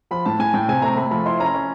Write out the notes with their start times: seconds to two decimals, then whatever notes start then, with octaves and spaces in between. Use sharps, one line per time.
0.11 F3 B5
0.26 A2 A5
0.39 A2 G#5
0.54 A2 G5
0.68 C3 G#5
0.82 A3 A#5
0.97 A3 B5
1.11 F3 B5
1.26 E4 C6
1.40 C#4 A#5
1.54 C#4